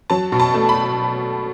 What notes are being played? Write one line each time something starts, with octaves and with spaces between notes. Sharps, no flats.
F#3 A5
B2
A5
A3
B5